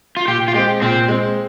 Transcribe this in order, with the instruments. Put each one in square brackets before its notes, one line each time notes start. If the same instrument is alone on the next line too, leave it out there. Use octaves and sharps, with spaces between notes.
[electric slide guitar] F4
[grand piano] A#2 [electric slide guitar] G4
[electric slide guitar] F4
[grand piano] G#3 C4 [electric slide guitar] G4
[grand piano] A#2 [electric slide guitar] C4
[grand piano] G#3 C4